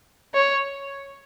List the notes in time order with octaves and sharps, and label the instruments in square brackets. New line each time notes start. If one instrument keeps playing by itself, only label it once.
[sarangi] C#5